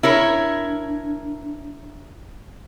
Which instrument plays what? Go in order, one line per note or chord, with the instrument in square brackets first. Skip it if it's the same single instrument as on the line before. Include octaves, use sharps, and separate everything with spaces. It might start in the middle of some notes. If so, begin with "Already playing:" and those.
[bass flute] D4 [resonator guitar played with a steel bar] E4 A#4 C#5